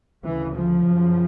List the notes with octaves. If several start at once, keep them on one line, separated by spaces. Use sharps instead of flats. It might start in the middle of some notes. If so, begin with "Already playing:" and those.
D2 C#3 E3
F3
F#2 C#3